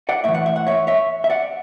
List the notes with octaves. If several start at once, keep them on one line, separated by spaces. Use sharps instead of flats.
D5 F#5
A2 E3 E5
F#5
E5
F#5
C#5 E5
C#5 E5
E5
D5 F#5